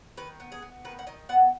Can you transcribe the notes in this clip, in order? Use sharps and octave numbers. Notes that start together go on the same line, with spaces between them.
D#3 B4
B3
G#4
B3
D#3 B4
F#5
D#3 D#5
B3 F#5